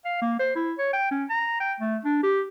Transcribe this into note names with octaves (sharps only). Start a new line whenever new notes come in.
F5
A#3
C5
E4
C#5
G5
C#4
A#5
G5
A3
D4
G4